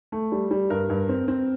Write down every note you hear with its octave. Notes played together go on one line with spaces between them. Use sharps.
A3
G3
G3
G2 A#4
G2
C4
C4